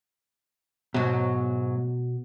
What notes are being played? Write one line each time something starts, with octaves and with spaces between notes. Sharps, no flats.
G#2 B2 F#3